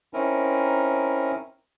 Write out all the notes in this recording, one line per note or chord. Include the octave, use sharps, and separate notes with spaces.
C4 C#4 D#4 E4 A#4